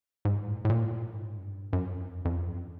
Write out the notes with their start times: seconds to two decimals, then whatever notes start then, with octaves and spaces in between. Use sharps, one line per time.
0.25 G#2
0.47 A2
0.65 A2
0.70 A#2
0.82 A2
0.91 A#2
1.13 G#2
1.38 F#2
1.44 G2
1.73 F#2
2.02 F2
2.25 F2
2.48 F#2